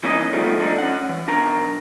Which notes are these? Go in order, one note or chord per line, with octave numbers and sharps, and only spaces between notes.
E3 A#3 C#4 D#4 E4 D#5
D2 D#3 F3 G3 A3 B3
F3 A3 D4 D#4
C#4 F#5
E3
B1 D4 A#4 A#5